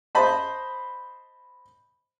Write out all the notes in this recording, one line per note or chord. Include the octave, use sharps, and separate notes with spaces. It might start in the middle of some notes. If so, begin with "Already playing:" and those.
C5 D#5 A5 B5